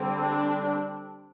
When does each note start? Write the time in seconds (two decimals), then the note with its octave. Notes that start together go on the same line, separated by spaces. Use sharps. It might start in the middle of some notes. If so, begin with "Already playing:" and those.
Already playing: D3 G3 C4
0.20 D4